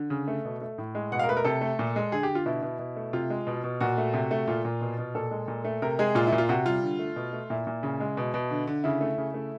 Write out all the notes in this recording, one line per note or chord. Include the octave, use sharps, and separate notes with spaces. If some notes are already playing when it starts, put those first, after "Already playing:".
Already playing: D3
C#3
A3
B2
A3
A2
G#3
B2 F#5
F5
A#4
A3 B4
A#4
C3 A4
A3
A#2
G#3
D3 G#4
G4
D3
F4
B2 E4
B2
B2
A3
C3 F4
G#3
B2
B2
A#2 F#4
A3
C3
A3
A#2 F4
A#2
B2
B2
A#2 A4
G#3
A#2
A3
C3 A#4
G#3 G#4
A#2 F4
E4
A#2
F4
C3 F#4
G3 F4
D3
A3
B2
A3
A#2 E4
A#2
C#3
G#3
B2
B2
D3
D3
C#3 E4
A3
C#3
A3